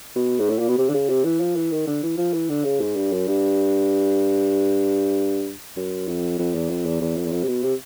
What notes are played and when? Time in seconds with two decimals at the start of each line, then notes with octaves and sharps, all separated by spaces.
0.15 B2
0.39 G#2
0.49 A2
0.59 A#2
0.68 B2
0.78 C3
0.89 D3
0.94 C#3
1.09 C3
1.24 E3
1.40 F3
1.56 E3
1.72 D#3
1.87 D3
2.03 E3
2.18 F3
2.33 E3
2.49 D3
2.65 C#3
2.80 G#2
2.96 G2
3.12 F#2
3.28 G2
5.77 F#2
6.08 F2
6.39 F2
6.55 E2
6.70 F2
6.86 E2
7.01 E2
7.17 F2
7.26 E2
7.32 F2
7.43 C3
7.48 B2
7.63 C3